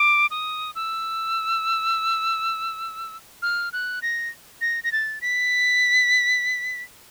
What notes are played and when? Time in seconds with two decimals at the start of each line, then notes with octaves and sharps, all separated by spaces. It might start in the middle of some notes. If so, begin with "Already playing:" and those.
Already playing: D6
0.31 D#6
0.75 E6
3.42 F6
3.73 F#6
4.02 A#6
4.61 A#6
4.84 A#6
4.92 A6
5.21 B6